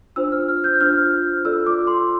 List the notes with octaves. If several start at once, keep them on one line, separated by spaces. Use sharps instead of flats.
D4 F4 C5 E6
F6
F6
G6
D4 F4 C5 F6
F4 A4 D5 E6
D6
C6